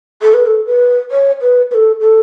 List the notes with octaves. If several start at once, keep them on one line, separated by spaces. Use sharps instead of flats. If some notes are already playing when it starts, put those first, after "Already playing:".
A4
B4
A4
B4
C#5
B4
B4
A4
A4